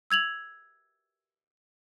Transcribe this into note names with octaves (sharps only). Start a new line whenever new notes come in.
E6 G#6 F7 F#7